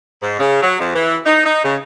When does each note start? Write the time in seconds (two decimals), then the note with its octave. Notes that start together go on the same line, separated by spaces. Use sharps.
0.22 G#2
0.39 C#3
0.62 F#3
0.80 F2
0.94 E3
1.25 D#4
1.45 D#4
1.64 C#3